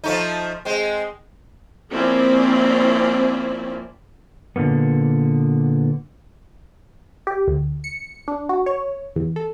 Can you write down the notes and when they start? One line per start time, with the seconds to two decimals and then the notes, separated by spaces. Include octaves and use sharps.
0.04 F3 A3 D#4
0.65 G#3 C4
1.91 F3 A#3 C4 C#4 E4 D5
4.56 A#2 D3 F3 A#3 B3
7.27 G4
7.48 D2
7.84 C#7
8.28 D4
8.49 F#4
8.66 C#5
9.16 E2
9.36 A4